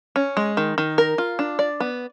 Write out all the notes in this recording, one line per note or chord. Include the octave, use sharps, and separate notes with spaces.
C#4
G#3
D#3
D#3
A#4
F4
D4
D5
B3